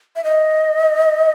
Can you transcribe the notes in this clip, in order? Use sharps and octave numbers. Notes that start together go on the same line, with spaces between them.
E5
D#5